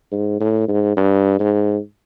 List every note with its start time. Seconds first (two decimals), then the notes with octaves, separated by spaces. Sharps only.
0.12 G#2
0.40 A2
0.68 G#2
0.97 G2
1.39 G#2